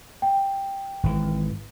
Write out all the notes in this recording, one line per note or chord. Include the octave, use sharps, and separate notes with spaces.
G5
G#1 E3